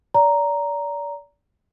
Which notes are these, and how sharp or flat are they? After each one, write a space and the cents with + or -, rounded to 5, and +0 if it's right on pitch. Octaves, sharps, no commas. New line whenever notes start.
D5 -30 A#5 +0